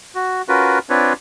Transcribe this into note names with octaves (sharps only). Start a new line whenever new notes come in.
F#4
C#4 F4 F#4 A#4 B4
C4 D4 F4 B4 C#5